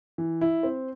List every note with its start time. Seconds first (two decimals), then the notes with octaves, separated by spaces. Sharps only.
0.18 E3
0.41 E4
0.63 C4